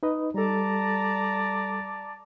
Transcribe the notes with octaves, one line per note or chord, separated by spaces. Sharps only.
D#4 B4 D#5
G3 A4 D5 A5 A#5